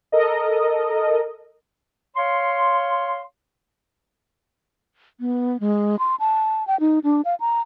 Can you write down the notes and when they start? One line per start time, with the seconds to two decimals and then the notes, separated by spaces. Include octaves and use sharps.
0.12 A4 A#4 D#5
2.16 C#5 F5 C6
5.20 B3
5.60 G#3
5.99 C6
6.20 A5
6.67 G5
6.80 D#4
7.04 D4
7.25 F5
7.40 A#5